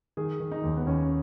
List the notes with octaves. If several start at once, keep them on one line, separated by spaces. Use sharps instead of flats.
D#3 G#4
D#3
D#4
D#2
B3
D#2 C#4